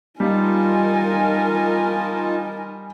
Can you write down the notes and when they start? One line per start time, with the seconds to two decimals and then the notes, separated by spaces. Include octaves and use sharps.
0.20 G3 D#4 F4 A#4 G#5 A5